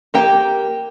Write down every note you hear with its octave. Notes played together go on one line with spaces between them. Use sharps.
A#3 G4 G5